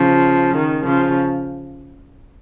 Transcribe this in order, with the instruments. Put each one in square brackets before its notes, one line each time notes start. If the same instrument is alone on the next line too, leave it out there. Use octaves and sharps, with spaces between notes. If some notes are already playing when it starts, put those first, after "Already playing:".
Already playing: [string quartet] C#3 F3
D#3
C#3 F3